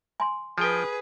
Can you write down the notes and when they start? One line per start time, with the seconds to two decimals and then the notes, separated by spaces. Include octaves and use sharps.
0.20 G#5 C6
0.58 F3 G#4 B4 G5